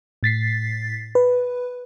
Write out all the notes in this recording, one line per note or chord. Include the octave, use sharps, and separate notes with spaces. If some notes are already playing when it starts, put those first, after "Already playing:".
A2 A6 B6 C7
B4